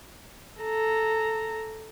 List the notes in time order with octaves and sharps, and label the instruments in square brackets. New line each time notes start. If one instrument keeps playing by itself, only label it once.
[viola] A4 A#5